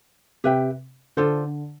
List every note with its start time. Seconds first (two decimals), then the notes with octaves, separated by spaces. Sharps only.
0.44 C3 G4 B4 E5 G5
1.17 D3 D4 F4 A4 C5